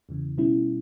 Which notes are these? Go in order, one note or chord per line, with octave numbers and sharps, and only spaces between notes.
E2 C#3 E3
B2 G3 C#4 E4